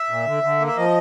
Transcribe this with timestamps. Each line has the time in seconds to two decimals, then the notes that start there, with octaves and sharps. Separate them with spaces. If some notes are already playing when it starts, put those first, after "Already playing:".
Already playing: E5
0.10 A#2
0.27 D3
0.43 D3
0.60 A#3
0.67 E5
0.77 F3 D#5